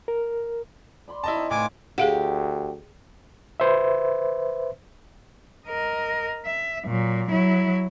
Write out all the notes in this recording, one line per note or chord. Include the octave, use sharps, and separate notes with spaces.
A#4
D5 B5 C6
E4 D#5 A5
C4 D#4 A#5
A2 B4 C5 F5 G#5 D6
D2 G4 G#4 F5 F#5
B4 C5 E5
A#4 D#5
E5
A#2 F#3
F#3 E4